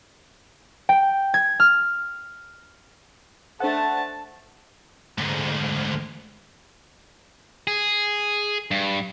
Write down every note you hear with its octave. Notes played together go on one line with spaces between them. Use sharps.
G5
G#6
F6
A3 D4 C5 F#5 A5
D2 G#2
G#4
G2